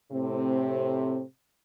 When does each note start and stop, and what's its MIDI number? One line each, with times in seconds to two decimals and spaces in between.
0.11 1.21 45
0.11 1.21 48
0.11 1.21 60